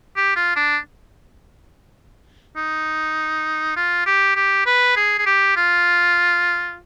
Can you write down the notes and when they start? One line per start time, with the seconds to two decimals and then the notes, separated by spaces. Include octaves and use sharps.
0.17 G4
0.36 F4
0.56 D4
2.56 D#4
3.76 F4
4.06 G4
4.36 G4
4.66 B4
4.96 G#4
5.18 G#4
5.26 G4
5.56 F4